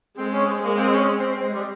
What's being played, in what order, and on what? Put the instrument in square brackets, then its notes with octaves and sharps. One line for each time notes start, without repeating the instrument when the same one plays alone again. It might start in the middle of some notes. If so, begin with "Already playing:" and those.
[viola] G#3 [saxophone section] C4
[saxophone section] C#4
C4
[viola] G#3 [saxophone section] A#3
[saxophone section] C4
C#4
C4
C4
G#3
G3